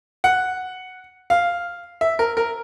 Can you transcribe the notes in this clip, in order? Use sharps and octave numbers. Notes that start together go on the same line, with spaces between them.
F#5
F5
E5
A#4
A#4